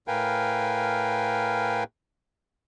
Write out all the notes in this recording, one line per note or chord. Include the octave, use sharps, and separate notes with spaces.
A2 A#4 B4 F5 G5 G#5